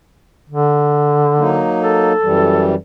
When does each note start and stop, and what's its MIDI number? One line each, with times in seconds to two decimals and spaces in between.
0.50 1.68 50
1.38 2.13 54
1.38 2.13 58
1.38 2.13 63
1.81 2.75 69
2.22 2.75 42
2.22 2.75 52
2.22 2.75 55